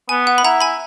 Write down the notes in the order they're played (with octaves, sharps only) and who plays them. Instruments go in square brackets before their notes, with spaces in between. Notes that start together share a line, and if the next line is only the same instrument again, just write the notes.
[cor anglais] B3 [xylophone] G#5
[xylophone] F#5
B5
[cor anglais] E4 [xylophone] F#5 A#5
[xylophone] G#5 B5